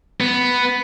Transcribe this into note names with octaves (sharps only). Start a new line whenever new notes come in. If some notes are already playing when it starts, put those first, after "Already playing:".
B3